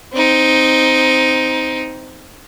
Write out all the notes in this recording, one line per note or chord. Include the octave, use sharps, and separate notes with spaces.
C4 D#4